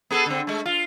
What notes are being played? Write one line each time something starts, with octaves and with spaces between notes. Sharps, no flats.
B3 G#4 A4
D3 C4
G#3 A3
F4